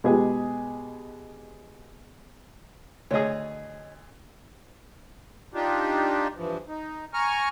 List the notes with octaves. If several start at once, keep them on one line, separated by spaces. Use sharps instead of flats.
B2 G#3 G4 G#4
D2 G#4 C#5 D#5
D4 D#4 F4 G4
G2 E3 F3
D#4
G#5 A#5 C#6 F6